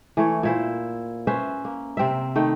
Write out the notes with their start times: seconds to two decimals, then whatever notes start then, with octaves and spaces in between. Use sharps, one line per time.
0.17 E3 A3 C#5
0.43 A#2 E4 C5
1.27 C#4 B4 C5 E5
1.65 A#3
1.97 C3 C4 A#4 E5
2.36 D#3 A3 G5